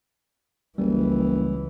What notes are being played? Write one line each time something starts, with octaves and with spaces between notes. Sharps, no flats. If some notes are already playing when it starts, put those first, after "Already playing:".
F#1 C#2 E3 G3